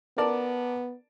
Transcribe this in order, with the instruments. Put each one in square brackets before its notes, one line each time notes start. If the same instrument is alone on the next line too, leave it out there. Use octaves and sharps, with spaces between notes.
[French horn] B3 [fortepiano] A#4 D5 A5